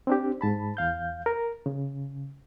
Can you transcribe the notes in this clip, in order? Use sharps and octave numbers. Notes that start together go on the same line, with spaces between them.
C4 D4 G4
G#2 A5 B5
E2 F5 G6
A#4
C#3